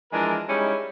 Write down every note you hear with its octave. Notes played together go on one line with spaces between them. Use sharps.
E3 F3 G#3 D4 A#4
G3 G#3 C#4 D#4 E4